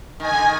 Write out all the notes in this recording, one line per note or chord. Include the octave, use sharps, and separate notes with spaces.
D#3 G#5
D3
D#3